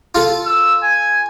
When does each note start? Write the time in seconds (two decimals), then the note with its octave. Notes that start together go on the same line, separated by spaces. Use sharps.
0.15 F4 A4
0.46 E6
0.83 G#5